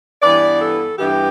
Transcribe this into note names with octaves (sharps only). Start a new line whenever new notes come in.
G2 E3 B3 D5
A4
G2 E3 B3 G4